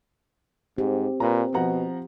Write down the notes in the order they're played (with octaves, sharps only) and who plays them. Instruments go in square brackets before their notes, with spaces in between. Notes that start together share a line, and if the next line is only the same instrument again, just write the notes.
[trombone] G#2 [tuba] C4 [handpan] G4
[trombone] A#2 [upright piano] B4 A#5
[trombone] B2 [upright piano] F3 F#5 A#5